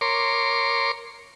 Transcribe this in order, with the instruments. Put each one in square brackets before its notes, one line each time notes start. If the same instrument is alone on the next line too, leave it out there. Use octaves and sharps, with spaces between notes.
[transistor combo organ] A#4 C#5 C6 D6